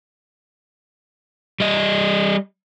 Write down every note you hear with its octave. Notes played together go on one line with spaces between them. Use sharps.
G3 D#5